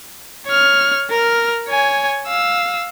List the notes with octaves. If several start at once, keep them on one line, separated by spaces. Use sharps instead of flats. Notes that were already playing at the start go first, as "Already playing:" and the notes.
C#5 F6
A#4 F6
C#5 G#5
F5 E6